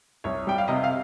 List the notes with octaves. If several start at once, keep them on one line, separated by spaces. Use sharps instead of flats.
C2 C#5
G3 G5
F5
C3 D#5
F5